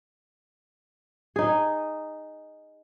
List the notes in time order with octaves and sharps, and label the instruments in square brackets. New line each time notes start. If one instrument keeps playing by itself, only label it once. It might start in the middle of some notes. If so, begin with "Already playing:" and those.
[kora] D#4 G#4